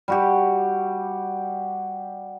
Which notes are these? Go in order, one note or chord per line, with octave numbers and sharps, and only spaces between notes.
G3 F#4 G4